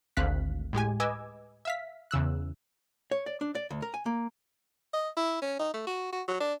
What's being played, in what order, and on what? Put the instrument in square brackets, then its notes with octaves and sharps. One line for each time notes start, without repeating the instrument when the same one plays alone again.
[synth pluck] G#1 D2 C4 F5 F#6 B6
A2 G#3 G4 G#5
B4 D#5 G#5 D6 E6 G#6
E5 F5 B6
E2 C#3 E6 F#6
[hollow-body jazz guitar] C#5
D5
D4
D5
D2
A#4
G#5
A#3
[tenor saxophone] D#5
E4
C#4
D#4
A3
F#4
F#4
F#3
D4